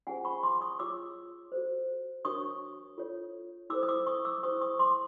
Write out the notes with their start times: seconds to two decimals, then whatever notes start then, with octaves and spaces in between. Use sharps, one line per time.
0.07 C#4 F4 G#4 C5 F#5 G#5
0.25 B5 C#6
0.43 C6 D6
0.61 C#6 D#6
0.79 F4 G#4 C#5 D6 E6
1.52 F#4 A4 C5
2.25 D4 F#4 A#4 C#5 C#6 D#6
2.98 F4 A4 C#5
3.70 E4 A4 C5 D6 E6
3.83 D#6
3.88 D6 E6
4.07 C#6 D#6
4.25 D6 E6
4.43 E4 G#4 C5 C#6 D#6
4.61 C#6 D#6
4.79 C6 D6